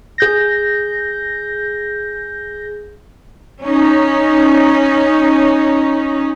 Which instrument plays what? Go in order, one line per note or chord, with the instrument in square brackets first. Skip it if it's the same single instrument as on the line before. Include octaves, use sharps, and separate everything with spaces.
[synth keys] G#4 G6 A#6
[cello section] C#4 D#4